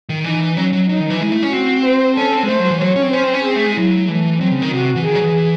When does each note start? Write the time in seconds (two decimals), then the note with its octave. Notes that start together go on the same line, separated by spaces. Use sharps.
0.09 D#3
0.24 E3 D#4
0.57 F#3 C#4
0.73 F#3
0.89 F#3 D#4
1.00 D#3
1.10 E3
1.21 G#3 E4
1.32 A3
1.43 C#4
1.53 C4 F#4
1.85 C5
2.17 C#4 A4
2.33 C4
2.43 G#3
2.49 A3 C5
2.60 F#3
2.70 E3
2.81 F#3 C#5
2.96 C#4
3.02 C4
3.13 C#4 C5
3.24 C4
3.34 C#4
3.45 C4 G#4
3.56 A3
3.66 G#3
3.77 F#3 E4
4.08 E3 A3
4.41 F#3 C4
4.51 C#3
4.62 D#3
4.73 C3 F#4
4.96 E3
5.04 D#3 G#4
5.15 F#3
5.21 E3